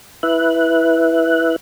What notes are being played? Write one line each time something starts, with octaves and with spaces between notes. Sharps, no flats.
E4 B4 E5 F#6